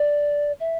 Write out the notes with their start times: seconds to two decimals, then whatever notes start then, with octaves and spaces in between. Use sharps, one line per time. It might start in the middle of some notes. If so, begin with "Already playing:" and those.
Already playing: D5
0.60 E5